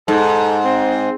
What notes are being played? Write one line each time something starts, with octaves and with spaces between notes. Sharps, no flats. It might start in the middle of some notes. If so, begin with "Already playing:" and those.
G#2 A4
C4